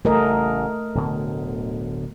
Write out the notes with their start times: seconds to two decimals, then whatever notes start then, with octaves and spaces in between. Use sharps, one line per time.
0.05 A1 C#3 G3 A3 A#4 D#5
0.95 D1 B2 D3